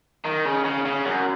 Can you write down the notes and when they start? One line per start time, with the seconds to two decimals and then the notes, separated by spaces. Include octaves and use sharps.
0.25 D#3
0.45 C#3
0.64 C#3
0.85 C#3
1.05 F#2